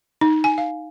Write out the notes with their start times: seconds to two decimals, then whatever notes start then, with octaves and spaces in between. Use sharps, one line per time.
0.21 D#4
0.44 G#5
0.58 F5